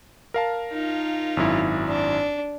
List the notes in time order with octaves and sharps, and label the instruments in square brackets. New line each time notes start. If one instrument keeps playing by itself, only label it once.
[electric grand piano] A#4 F5 A5
[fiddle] D#4 F4
[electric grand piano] G#1 F#2 E4
[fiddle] D4